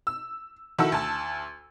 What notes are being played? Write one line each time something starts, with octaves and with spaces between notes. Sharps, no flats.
E6
D#3 E4 F#4 A4 E6
D2 A5